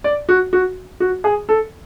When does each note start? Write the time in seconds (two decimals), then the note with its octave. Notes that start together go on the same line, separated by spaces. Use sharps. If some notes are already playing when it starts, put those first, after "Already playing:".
0.04 D5
0.29 F#4
0.53 F#4
1.00 F#4
1.24 G#4
1.49 A4